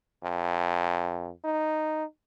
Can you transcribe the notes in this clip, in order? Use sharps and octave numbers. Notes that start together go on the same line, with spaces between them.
F2
D#4